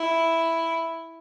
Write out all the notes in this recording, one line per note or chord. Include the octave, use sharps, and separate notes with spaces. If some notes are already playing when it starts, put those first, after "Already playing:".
Already playing: E4